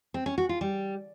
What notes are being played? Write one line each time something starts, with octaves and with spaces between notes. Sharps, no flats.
C4
C#4
F#4
F4
G3